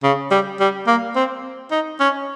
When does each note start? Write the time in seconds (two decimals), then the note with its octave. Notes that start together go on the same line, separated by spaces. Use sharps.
0.04 C#3
0.31 G3
0.60 G3
0.87 A#3
1.16 C4
1.71 D#4
2.00 C#4